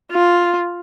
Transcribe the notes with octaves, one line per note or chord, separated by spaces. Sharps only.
F4